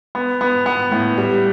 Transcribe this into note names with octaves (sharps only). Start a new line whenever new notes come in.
B3
B3
B3
A2
G3